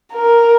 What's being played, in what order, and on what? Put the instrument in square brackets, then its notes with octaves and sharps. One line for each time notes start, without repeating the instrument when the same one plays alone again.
[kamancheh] A#4